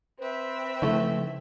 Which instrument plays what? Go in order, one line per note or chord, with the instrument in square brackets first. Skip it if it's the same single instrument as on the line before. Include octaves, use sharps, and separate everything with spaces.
[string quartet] C4 E5 [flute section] B4 C5
[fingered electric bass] C#3 F3 [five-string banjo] A3 E4